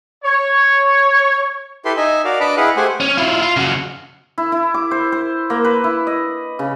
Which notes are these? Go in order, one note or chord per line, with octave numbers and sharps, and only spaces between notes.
C#5
E4 G4 A4 B4 C6
D#4 D#5 E5 G#5
F#4 A#4 D5 F5
D4 B4 D#5 A5 B5 D6
E4 G#4 B4 D#5 F5 F#5
A3 G4 G#4 C5 F#5 G#5
C#4
E4 F4
F4
C#3 F#4
E4
E4
D6
C5
C5
A#3
B4
E4
D#5
C#3